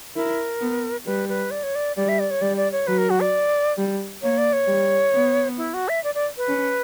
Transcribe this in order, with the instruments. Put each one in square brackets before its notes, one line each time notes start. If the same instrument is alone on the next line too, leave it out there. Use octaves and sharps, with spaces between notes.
[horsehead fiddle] E4 [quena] A#4
[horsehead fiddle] B3
[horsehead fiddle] G3 [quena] B4
[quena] B4
D5
C#5
D5
[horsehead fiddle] G3 [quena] D5
[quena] E5
D5
C#5
[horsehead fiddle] G3 [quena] D5
[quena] D5
C#5
[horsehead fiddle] F#3 [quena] B4
[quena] A#4
F#4
D5
[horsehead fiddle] G3
[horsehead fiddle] A#3 [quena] C#5
[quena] D5
C#5
[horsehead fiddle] G3
B3
[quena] E4
F#4
E5
D5
D5
B4
[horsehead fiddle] C#4